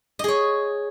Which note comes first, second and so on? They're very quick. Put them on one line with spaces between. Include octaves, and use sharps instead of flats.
D#5 G#4 C#5